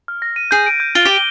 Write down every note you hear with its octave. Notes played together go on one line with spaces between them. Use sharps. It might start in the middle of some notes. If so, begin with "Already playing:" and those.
F6
A#6
D#7
G#4 G6
D7
G6
F4 G7
G4 G7